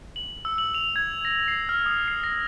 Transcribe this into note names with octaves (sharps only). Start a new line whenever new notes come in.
F#7
E6
F#7
F7
G#6
A#6
C7
F6
D#6
C7
A#6